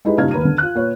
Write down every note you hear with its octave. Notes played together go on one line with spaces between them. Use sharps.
G#3 D#4 E4 G4 G#4 B4
G2 A#2 C#3 D#4 F6 G#6
D#2 B4 A#5 D#7
D3
F4 F#6
A#2 B4 C#5